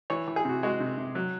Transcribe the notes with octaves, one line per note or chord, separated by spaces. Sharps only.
E3 C#5
E3
G#4
C3 F#4
G#3 F#4
C3
C3
F#3